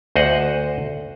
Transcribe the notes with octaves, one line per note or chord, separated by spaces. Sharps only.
D2 C5 D#5 F#5